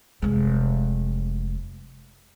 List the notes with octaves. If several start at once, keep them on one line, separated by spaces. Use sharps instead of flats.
F1 G#3